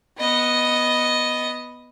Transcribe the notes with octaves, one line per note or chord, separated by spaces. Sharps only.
B3 D#5